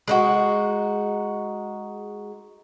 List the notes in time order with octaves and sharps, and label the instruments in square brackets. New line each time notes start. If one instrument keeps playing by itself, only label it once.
[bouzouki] G#3 D#4 F#4